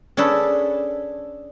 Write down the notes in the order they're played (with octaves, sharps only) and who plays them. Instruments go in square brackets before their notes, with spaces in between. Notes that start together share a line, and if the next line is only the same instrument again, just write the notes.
[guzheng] C#4 D4 G#4 A4 B4